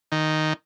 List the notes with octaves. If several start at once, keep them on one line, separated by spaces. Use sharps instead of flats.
D#3